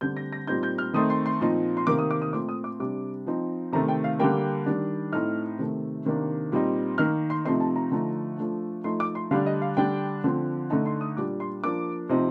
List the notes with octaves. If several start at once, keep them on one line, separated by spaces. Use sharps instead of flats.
D3 G3 C4 G6
A#6
A#6
A#2 G3 C4 D#4 G6
G6
F6
D#3 A3 C4 D#4 D#6
C6
C6
A#2 F3 C4 D#4
C6
C3 D#3 A#3 D6
D#6
D6
D#6
A#2 A3 C4 D6
D#6
D6
C3 G3 D4 D6
F3 C4 D#4
C3 D#3 A3 A#5
G5
F5
D3 G3 A#3 G5
D#3 G3 D4
A2 A3 C4 D#4 F6
C3 D#3 A3
C3 D#3 A#3 D4
A#2 G3 C4 D#4
D#3 A#3 D#4 F6
C6
C3 F3 A3 C4 D#4 C6
A5
A#5
D3 F3 A3 D#4
F3 A3 D4
F3 A3 D#4 C6
D6
C6
D3 G3 D4 F5
D#5
F5
D3 G3 D4 G5
D3 F3 C4
D3 A3 D#4 A5
C6
D#6
A#2 G3 D4 D6
C6
F3 A#3 D4 D6
C3 F3 C4 D#4